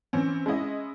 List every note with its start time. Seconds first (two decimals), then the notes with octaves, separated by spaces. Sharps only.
0.13 E3 C4 C#4
0.46 G#3 C#4 E4 D#5